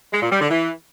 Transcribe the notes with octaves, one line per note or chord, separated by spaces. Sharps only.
G#3
A#2
G3
D3
E3